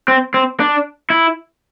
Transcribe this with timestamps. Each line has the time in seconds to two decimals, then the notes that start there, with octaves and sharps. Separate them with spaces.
0.08 C4
0.34 C4
0.60 D4
1.10 E4